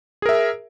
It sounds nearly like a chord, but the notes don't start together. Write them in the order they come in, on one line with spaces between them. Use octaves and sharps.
G#4 A#4 E5